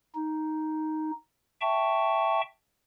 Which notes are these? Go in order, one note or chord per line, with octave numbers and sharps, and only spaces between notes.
D#4
E5 G5 A5 C#6